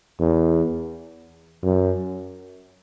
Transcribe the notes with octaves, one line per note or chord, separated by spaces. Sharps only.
E2
F#2